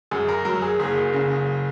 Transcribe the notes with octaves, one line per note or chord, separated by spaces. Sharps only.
F#2 G#4
A#4
F#3 A#4
G#4
F#1 G#4
C#3